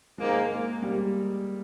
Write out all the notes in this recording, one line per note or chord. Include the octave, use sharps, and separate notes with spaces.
G#2 D#3 G#3 A#3
A#3
G3